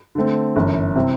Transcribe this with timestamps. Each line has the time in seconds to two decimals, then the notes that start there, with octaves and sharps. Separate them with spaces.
0.15 D3 A3 C4
0.56 G1 F#2 E3
0.96 C3 G3 C4 E4